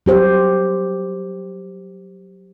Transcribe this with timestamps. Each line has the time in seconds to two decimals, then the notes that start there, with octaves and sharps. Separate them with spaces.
0.06 F#3 G4 C5